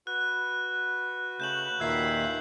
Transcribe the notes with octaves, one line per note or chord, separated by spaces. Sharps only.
F#4 B4 F#6
C#3 A3 G6 E7 F#7
D#2 A#2 D#3 E5 E6 G#6 C7